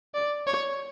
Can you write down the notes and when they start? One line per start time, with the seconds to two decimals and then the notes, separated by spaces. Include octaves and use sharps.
0.14 D5
0.47 C#5